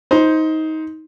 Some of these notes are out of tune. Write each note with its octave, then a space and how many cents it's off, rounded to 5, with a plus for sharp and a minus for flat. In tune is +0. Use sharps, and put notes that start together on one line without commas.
D#4 +20 C5 +0